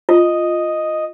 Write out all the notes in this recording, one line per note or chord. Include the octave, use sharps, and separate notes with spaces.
F4 D#5